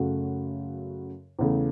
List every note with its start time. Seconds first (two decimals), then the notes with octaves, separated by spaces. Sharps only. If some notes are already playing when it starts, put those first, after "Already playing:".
Already playing: F#2 C#3 A3 F#4
1.39 E2 C#3 A3